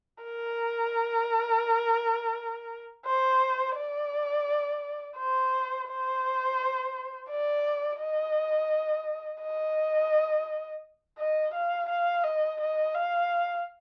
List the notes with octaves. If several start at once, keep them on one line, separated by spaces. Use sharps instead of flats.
A#4
C5
D5
C5
C5
D5
D#5
D#5
D#5
F5
F5
D#5
D#5
F5